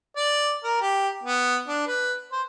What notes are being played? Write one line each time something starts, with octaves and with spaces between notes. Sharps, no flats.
D5
A#4
G4
B3
D4
B4
C5